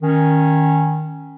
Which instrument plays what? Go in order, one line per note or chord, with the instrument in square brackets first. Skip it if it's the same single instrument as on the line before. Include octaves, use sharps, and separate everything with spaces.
[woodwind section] D#3 C#4